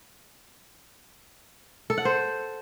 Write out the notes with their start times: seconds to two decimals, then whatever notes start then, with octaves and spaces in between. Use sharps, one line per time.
1.90 A4
1.98 F#5
2.05 C5